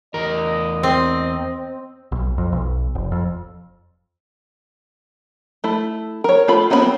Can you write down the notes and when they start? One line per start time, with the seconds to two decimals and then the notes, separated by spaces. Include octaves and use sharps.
0.14 E2 A#4 D#5
0.83 C4
2.12 B1
2.38 F2
2.52 B1
2.95 F1
3.12 F2
5.64 A3 E4
6.24 A#4 C#5
6.48 A3 F4 B5
6.70 A#3 B3 C#4 D#5 B5
6.82 C4